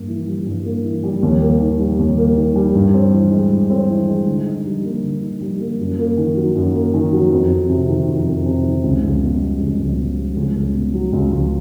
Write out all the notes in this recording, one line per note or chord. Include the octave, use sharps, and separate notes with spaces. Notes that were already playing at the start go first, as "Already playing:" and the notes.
Already playing: G2 A#3
E3
G3
G2
A#3
E3
G3
D#2
A#3
D#3
G3
D#2
A#3
D#3
G3
G2
C4
E3
G#3
G2
C4
E3
G#3
D3
D#4
G3
A#3
D3
D#4
G3
A#3
F#2
A#3
D#3
F#3
F#2
A#3
D#3
F#3
F2
F2
C3
D#3
F2
F2
C3
D#3
C#2
C#2
B2
G3
C#2
C#2
B2
G3
C#2
C#2
B2
F#3
C#2
C#2